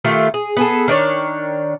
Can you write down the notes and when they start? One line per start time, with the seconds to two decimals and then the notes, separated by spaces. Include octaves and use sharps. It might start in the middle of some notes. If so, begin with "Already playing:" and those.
0.05 D#3 A3 F4 G4
0.34 G#4
0.57 B3 G#4 A4
0.88 D#3 D4 C#5 D5